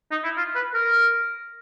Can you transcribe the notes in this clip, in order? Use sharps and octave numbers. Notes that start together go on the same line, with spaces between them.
D#4
E4
F4
B4
A#4